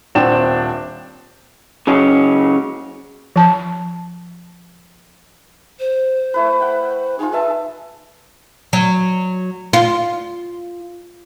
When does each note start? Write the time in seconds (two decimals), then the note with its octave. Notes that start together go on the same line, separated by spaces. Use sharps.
0.15 D#1 C4 D4 F#5 G5 E7
1.87 C#3 F#3 G#3 C#4
3.36 F3 A5
5.79 C5
6.34 A3 E4 B4
6.60 F#5 G5
7.19 D#4 F4 G#4
7.32 G#4 B4 E5 A5
8.73 F#3
9.73 F4